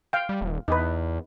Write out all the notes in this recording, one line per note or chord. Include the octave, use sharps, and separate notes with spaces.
F5 G5
G3
D#1
E2 D#4 B4